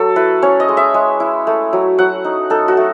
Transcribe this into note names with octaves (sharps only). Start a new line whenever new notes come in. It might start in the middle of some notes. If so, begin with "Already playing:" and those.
Already playing: F#3 A3 A4
E4 B4
C#4 C#5
D#5
G#3
E5
G#3
E4
A3
F#3
F#3 F#5
D#4
D#4 A4
F#4
A3